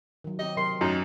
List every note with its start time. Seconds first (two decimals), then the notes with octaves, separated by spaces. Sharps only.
0.24 D#3 F#3
0.39 C4 G4 D#5
0.57 C3 F#3 A#4 C6
0.81 F#2 A3 D#4